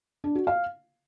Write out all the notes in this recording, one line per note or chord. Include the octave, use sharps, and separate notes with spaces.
D4
F#4
F5